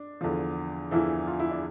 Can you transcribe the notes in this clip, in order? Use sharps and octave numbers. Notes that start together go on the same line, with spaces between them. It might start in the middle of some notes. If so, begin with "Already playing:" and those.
Already playing: D4
E2 D3 F3
E2 D3 E3 F3 E4
F4
E4
D4